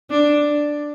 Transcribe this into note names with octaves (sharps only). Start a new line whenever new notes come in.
D4